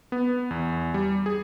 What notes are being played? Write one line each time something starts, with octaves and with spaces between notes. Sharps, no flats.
B3
E2
G3
G#4